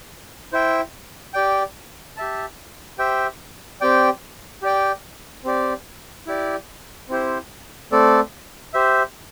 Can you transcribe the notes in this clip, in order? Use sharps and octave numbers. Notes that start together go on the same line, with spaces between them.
E4 C5 E5 G5
G4 D5 G5
G4 E5 A5
G4 C5 E5 G5
C4 G4 D5 G5
G4 D5 G5
C4 G4 D5
E4 G4 D5
C4 E4 G4 C5
A3 C4 A4 D5
G4 C5 E5